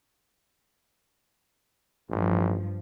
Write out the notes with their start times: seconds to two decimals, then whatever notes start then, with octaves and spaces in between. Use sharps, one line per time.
2.10 A1 G2 F3